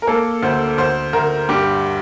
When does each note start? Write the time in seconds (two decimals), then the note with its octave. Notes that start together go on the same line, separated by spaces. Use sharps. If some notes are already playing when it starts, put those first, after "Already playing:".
0.02 A#4
0.07 A#3 A4
0.43 D2 C5
0.78 D2 C5
1.13 D2 A#4
1.49 G2 G4